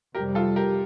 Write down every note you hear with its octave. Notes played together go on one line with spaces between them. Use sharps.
F2 C3 G3 G4 A#4
F4 A4
G4 A#4